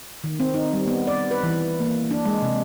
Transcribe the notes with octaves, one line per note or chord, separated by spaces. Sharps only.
D#3
C4
D#4
G3
B3
D5
B4
E3
A#3
D4
G#3
C3